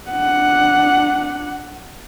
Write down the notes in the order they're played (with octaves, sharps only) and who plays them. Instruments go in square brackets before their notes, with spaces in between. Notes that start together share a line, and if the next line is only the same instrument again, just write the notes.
[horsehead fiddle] D4 F#5